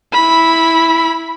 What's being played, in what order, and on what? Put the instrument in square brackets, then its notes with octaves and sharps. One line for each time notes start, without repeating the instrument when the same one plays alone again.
[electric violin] E4 B5